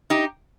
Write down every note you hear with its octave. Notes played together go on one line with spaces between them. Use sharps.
D#4 G4